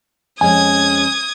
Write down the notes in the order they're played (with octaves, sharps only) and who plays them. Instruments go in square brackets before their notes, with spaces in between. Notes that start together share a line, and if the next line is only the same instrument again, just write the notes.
[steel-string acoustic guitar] F2 G#3 C#4 [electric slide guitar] G#5 [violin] D#6 G#6